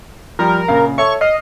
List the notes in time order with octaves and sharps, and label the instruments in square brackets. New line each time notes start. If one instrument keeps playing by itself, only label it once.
[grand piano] F3 G3 [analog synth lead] A#4
[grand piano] A#1 C#3 F5
[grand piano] A4 C#5 E5 [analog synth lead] C#6
[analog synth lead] D#5 [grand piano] F6 C7